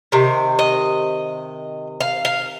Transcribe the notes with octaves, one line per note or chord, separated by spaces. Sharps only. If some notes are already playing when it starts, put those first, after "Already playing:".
C3 D#3
D#5
F5
F5